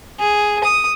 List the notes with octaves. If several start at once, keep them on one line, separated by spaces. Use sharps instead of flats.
G#4
D#6